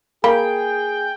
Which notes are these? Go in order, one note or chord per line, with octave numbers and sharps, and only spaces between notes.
A#3 G#4 G5 B5